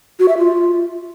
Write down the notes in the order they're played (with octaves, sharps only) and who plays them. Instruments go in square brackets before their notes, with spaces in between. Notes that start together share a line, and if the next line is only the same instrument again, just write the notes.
[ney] F#4
E5
F4